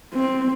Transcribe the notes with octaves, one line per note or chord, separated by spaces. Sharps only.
C4